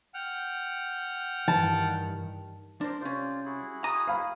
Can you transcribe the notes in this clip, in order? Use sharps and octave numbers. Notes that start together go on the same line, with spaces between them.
F#5 G5 F6
G2 D#3 E3 A5
D4 A#4 C5 A#5 C6
C2 C#4 F4 C5 D5
E4 F#4 G#4
A#5 D#6
F5 B5